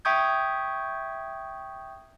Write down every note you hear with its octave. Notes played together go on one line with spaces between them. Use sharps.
E5 G5 C#6 D#6 G6 G#6